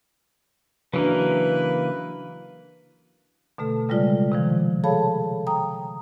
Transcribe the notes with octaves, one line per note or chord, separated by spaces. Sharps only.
C#3 E3 F#3 A#3 D4 B4
B2 D3 A3 A4
C#3 G3 G#3 F4 D5
C3 D#3 F3
G#4 A4 C#5 F5 A5 B5
G5 A#5 D#6